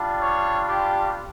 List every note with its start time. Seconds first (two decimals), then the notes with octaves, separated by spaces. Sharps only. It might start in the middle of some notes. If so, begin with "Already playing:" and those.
Already playing: G3 D4 F4
0.21 C#5
0.67 G4